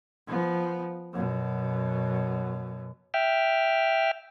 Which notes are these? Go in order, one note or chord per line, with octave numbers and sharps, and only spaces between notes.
F3 B3
F#2 B2
E5 G5 F6